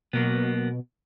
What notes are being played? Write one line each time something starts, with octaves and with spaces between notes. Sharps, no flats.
B2 F#3 A#3 B3